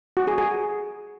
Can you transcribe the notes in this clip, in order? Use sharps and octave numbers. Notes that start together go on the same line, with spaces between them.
F#4
G#4
G#4